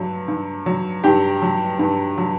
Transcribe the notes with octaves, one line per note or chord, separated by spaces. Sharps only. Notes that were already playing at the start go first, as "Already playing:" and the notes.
Already playing: G2 F#3
G2
F#3
G2 G4 G5
F#3
G2
F#3